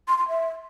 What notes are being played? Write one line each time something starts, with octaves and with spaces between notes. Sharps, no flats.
C6
C6
E5